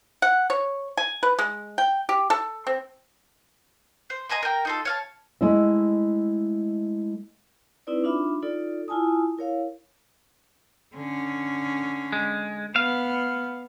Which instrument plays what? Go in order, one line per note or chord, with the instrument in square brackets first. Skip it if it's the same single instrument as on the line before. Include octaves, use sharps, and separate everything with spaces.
[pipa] F#5
C#5
G#5
B4
G#3
G5
G4
A4
C4
[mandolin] C5
D#5 G#5 A#5 C6
A#4 G5
D#4 F4 A4
C#5 F5 A5
[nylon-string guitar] G#3 A3 E4 D#5 E5
[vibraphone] C4 D#4 E4 B4 D5
D4 D#4 F4 E5 B5 D6
D#4 F4 A4 D5
E4 F4 G#5 A5 D#6
E4 A#4 C#5 F5
[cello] D3 C#4
[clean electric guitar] G#3
[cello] B3 [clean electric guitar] F5